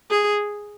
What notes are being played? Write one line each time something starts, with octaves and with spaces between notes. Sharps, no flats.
G#4